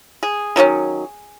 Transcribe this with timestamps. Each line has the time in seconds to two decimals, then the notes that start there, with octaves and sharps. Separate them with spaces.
0.23 G#4
0.56 D#3 F#3 A3 C#4